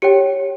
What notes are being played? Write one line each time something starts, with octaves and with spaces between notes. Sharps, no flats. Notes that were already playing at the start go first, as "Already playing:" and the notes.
G4 C#5 G5 C#7